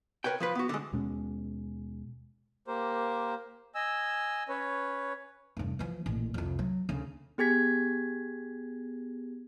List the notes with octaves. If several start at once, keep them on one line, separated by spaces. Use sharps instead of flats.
A#4 B4 C#5 G5
F3 F4 B4
B3 F#4
D3 G#3
D#2 B2 G#3 C#4
A#3 G4 A#4 C5
D#5 G#5 E6
C#4 B4 C#5
F1 G2
E3 F3
A1 A#2
C2 F2
F#3
D2 C#3
B3 G4 G#4 G#6 B6